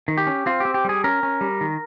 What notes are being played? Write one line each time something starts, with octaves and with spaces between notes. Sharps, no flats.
D#3
G4
C#4
C4 F4
C4 G4
G4
G3 G#4
C#4 A#4
C#4
G3
D#3